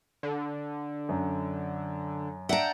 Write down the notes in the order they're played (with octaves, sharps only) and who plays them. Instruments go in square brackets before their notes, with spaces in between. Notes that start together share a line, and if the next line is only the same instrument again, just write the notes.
[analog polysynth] D3
[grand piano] F#2
[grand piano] D4 E5 [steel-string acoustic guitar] F#5 A#5 [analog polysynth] G5 A5